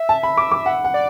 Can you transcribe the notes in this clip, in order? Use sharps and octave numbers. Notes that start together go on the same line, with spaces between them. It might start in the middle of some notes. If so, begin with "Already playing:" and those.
Already playing: E5
A5
B5
D6
D6
F#5
F#5
D5